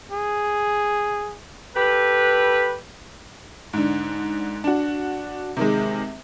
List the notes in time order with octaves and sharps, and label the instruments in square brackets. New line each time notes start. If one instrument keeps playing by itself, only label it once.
[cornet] G#4
[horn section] G4 A4 B4
[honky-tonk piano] G#2 D3
D4 F#4
C3 D#3 G#3